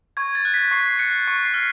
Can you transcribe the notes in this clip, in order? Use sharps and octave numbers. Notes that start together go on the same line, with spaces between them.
C#6 G#6
A6
F#6
B6
C#6 C7
F#6 C#7
C#6 C#7
C7
F6